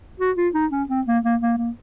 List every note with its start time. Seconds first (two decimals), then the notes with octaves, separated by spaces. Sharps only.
0.19 F#4
0.37 F4
0.54 D#4
0.71 C#4
0.89 C4
1.07 A#3
1.24 A#3
1.41 A#3
1.58 A#3